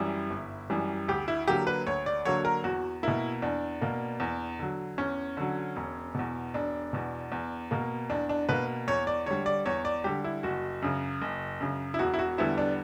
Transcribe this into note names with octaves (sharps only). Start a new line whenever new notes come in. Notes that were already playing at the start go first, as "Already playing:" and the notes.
Already playing: F#2 E3 G3 E4
G1
F#2 E3 G3
D2 G4
E4
D3 F#3 A#3 G4
B4
D2 C#5
D5
D3 F#3 A#3 C#5
A#4
E2 F#4
B2 A#3 E4
E2 D4
B2 A#3
E2
D3 F#3
E2 C#4
D3 F#3
E1
E2 B2
E1 D4
E2 B2
E2
B2 A#3
E2 D4
D4
B2 A#3 B4
E2 C#5
D5
D3 G3 C#5
D5
E2 C#5
D5
D3 G3 G4
E4
F#1 F#4
F#2 C#3
F#1
F#2 C#3
E4
E1 F#4
E4
F#4
E2 D3 G3 B3 E4
D4